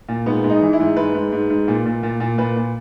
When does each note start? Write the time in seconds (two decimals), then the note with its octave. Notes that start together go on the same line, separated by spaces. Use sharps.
0.09 A#2
0.26 G#2 B3
0.44 G#2
0.50 D#4
0.62 E3
0.73 E4
0.80 G#2
0.97 G#2 B4
1.15 G#2
1.32 G#2
1.50 G#2
1.68 A#2
1.86 A#2
2.03 A#2
2.20 A#2
2.38 A#2 B4
2.56 A#2